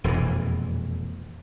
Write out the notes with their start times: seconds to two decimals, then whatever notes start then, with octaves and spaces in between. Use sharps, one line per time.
0.04 E1 F2 A#2 E3